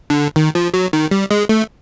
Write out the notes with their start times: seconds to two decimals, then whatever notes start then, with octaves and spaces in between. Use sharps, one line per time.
0.10 D3
0.36 D#3
0.55 F3
0.74 F#3
0.93 D#3
1.11 G3
1.31 G#3
1.49 A3